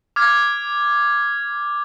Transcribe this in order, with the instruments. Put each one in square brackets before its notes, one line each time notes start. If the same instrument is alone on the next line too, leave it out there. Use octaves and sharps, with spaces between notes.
[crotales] D6 F6 G#6